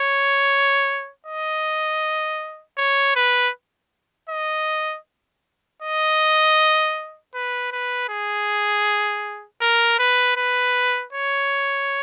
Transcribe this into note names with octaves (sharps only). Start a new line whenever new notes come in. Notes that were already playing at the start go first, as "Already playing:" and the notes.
Already playing: C#5
D#5
C#5
B4
D#5
D#5
B4
B4
G#4
A#4
B4
B4
C#5